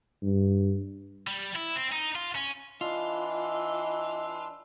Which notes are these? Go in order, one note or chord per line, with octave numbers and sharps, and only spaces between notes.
G2
G3
E4
C4
D#4
F4
C#4
E3 D4 F4 D#5 C6 E6